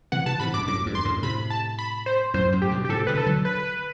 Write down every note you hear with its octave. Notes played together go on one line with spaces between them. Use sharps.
C3 E3 F#5
C3 E3 A5
A2 C3 B5
G2 B2 D6
F#2 A2 D6
E2 G2
C6
F#2 A2
A2 C3 B5
A5
B5
C5
F#2 A2 C5
F#2 A2
G4
G2 B2
G4
A2 C3 A4
B2 D3 B4
A4
D3 F#3
B4